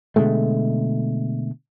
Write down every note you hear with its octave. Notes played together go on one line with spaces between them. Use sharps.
B2 D3 G#3 A3